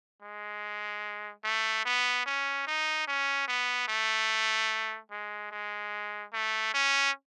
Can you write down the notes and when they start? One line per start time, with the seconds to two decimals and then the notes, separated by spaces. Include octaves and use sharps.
0.22 G#3
1.44 A3
1.85 B3
2.26 C#4
2.67 D#4
3.07 C#4
3.48 B3
3.88 A3
5.11 G#3
5.51 G#3
6.33 A3
6.74 C#4